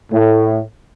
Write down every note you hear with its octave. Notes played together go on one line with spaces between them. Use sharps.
A2